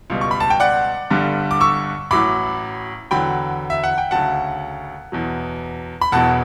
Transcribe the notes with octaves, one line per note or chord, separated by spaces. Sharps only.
C#2 B2 G3
C#6
B5
A5
G5
D5 F#5
G1 G2 D3 G3
D6
C#6 E6
A1 A2 F#3 B5 D6
E2 D3 F#3 G5 B5
E5
F#5
G5
D2 C#3 F#3 F#5 A5
E2 B2 F#3
B5
E1 E2 B2 F#3 F#5 A5